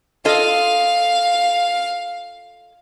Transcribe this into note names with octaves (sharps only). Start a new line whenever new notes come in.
F4 A4 D#5 F5